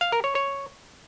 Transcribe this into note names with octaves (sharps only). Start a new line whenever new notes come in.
F5
A#4
C#5
C#5